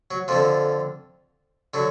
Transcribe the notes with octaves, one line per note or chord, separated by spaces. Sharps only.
F#3
F2 D3 F3
D3 F#3